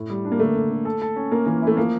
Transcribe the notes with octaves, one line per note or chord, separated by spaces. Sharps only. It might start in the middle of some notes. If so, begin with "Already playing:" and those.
Already playing: A2
G3
D4
A#3
D3 A3
D3
D3
A4
A4
C#4
A#3 A#4
E3 A#3
A3 E4
F3 A#3